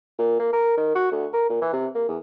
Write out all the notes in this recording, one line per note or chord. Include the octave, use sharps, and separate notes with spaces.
A#2
A#3
A#4
D#3
F#4
D2
A#4
A#2
E3
C3
A#3
E2